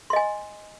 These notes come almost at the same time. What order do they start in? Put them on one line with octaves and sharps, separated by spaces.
C6 D#5 G#5